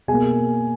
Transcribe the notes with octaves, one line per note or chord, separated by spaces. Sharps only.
B2 G#4 G#5
A#3